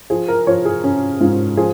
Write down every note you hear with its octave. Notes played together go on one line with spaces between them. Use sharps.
F3 G#4
A#4
F3 C#5
G#4
C#4
G#2 F4
F3 G#4